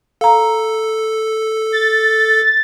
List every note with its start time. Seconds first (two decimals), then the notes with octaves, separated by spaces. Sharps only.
0.21 A4 F5 A#5
1.72 A6